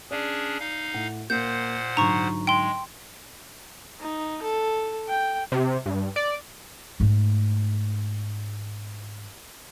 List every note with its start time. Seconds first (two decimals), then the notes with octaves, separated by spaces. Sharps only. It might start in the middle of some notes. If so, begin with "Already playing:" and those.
0.11 C#4 D4 G#4 D5
0.60 D#4 F5
0.94 A2 F#5
1.30 A#2 A#3 C5 F#5 G6
1.97 G#2 D3 F#3 A#5 C#6
2.47 G#3 G5 C6
4.00 D#4
4.42 A4
5.09 G5
5.52 C3
5.86 G2
6.16 D5
7.00 G#2 A3